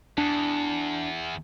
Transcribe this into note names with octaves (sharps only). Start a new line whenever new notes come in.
E2 D4